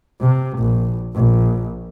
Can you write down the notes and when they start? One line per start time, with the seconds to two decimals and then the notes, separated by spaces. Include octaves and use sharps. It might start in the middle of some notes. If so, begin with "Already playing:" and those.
0.21 C3
0.59 A#1
1.15 A#1